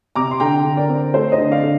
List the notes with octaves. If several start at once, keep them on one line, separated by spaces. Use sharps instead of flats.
C3 A#5 D6
C6
D3 G5 A#5
D3
A#4 D5
C4
A3 A4 C5
C5 D#5
D3
D5 F5
D3